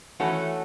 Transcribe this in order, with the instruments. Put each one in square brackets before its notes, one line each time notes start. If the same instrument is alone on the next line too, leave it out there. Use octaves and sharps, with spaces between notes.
[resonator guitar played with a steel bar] E3 A3 C#4 F#4 A4